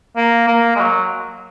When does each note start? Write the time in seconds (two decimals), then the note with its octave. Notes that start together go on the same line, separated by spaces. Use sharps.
0.17 A#3
0.48 A#3
0.76 G#3
0.80 F#3